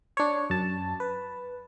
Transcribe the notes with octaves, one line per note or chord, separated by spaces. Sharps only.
D4 C#5
F#2 A5
B4